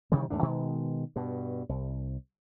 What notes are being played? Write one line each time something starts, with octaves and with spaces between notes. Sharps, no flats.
C3 D#3 E3 G3
D#2 G#2 A3 D4
B2 D#3 G#3
G2 B2
C2